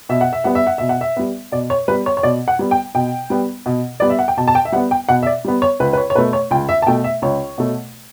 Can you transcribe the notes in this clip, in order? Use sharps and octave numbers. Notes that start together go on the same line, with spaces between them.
B2 E5
F#5
E5
G3 B3 F#5
E5
F#5
B2 E5
F#5
E5
G3 B3
B2 D5
C#5
G3 B3 B4
C#5
C#5
B2 D5
F#5
G3 B3
G5
B2 G5
G3 B3
B2
G3 B3 D5
E5
F#5
G5
B2 A5
A5
G5
E5
G3 B3 F#5
G5
B2 F#5
E5
D5
G3 B3
C#5
C#2 B4
B4
C#5
C#5
B2 A3 B4
C#5
C#2 G5
E5
A5
B2 A3 G5
E5
C#2 C#5
B2 A3